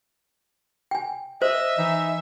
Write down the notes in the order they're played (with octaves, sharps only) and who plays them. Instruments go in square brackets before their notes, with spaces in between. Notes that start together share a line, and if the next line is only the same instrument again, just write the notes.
[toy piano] G5 G#5
[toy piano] C5 [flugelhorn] D#5 [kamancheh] E5
[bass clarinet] E3 [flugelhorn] D#4